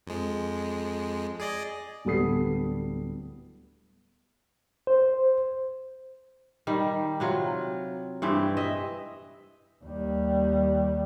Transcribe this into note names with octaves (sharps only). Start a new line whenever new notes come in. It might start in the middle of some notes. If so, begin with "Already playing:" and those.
F2 G#3
G#4 D5 D#5
D1 G3 B3 A4 D#6 C7
C5
D#3 G3
C3 F#3 F4
G2 E3 C4
D#5 E5
D#2 G3